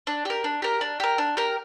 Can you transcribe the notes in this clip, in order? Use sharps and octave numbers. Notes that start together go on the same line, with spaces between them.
D4
G4 A#4
D4
G4 A#4
D4
G4 A#4
D4
G4 A#4